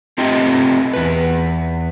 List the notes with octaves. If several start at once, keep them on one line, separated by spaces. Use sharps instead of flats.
A3 C4 F4 G4 D#5 G5
E2 B4